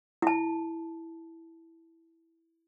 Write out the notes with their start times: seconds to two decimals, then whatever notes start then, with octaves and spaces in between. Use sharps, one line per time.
0.22 E4 A5